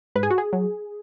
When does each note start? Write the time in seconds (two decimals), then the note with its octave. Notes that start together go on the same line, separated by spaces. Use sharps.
0.15 G#2 B4
0.23 G#4
0.30 F#4
0.38 G#4
0.53 F#3